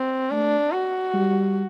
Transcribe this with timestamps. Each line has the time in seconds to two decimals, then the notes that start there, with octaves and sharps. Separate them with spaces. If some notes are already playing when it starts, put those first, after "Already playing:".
Already playing: C4
0.31 A3 D4
0.72 F#4
1.14 G3